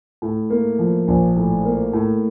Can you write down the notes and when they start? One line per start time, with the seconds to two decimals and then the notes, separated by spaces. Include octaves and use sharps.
0.22 A2
0.50 A#3
0.79 F3
1.08 A#1
1.36 A2
1.65 A#3
1.93 A2